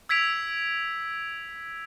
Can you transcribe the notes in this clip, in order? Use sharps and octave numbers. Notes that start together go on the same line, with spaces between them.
E6 G#6 B6 D7 F7